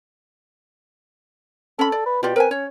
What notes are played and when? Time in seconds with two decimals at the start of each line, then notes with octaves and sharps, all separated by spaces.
1.79 C#4 A4 B5
1.92 D5
2.06 B4
2.23 B2 F4 G4 D5
2.36 C4 A#4 B4 G#5
2.51 C#4 C#5